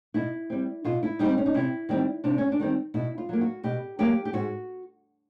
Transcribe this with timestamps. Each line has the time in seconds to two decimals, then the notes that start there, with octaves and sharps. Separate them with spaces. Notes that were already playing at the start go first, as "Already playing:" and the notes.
0.14 B2 E4
0.50 G3 C4
0.85 B2 F4
1.03 E4
1.19 G3 C4 D#4
1.38 C#4
1.46 D#4
1.54 C3 E4
1.89 D#3 G3 C4
2.24 C3 D4
2.38 C#4
2.52 D4
2.60 D#3 G3 C4
2.94 B2 E4
3.18 F4
3.29 F#3 A#3
3.41 F#4
3.64 B2 G4
3.99 F#3 A#3 G4
4.25 G4
4.33 G#2 F#4